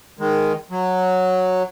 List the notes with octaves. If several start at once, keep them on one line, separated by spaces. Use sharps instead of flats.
D#3 G#3
F#3